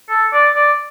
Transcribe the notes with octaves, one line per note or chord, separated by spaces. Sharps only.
A4
D5
D5